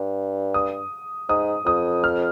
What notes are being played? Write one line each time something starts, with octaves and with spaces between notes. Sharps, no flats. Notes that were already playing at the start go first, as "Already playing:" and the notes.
Already playing: G2
D#6
G#2 D#6
F2 D#6
F6